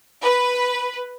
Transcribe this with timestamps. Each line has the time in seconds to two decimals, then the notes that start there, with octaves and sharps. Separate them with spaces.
0.21 B4